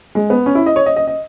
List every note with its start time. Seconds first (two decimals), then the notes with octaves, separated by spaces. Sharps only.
0.15 G#3
0.30 B3
0.46 C#4
0.55 E4
0.66 D#5
0.76 C#5
0.86 D#5
0.96 D#5
1.07 D#5